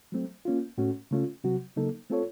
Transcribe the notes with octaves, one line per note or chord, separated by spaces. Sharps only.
F#3 A3 C4
A#3 C#4 F4
A2 A3 C#4 F#4
C#3 A3 C#4 F4
C3 F#3 C4 F#4
C#3 F#3 A#3 D#4 A4
A3 C4 F4 A4 C#5